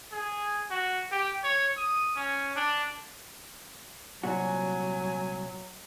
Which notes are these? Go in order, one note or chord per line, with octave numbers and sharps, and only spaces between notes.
G#4
F#4
G4
C#5
D#6
C#4
D4
C2 A#2 F#3 F#4 G#5